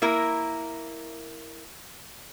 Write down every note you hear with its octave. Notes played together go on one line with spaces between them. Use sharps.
A#3 E4 A#4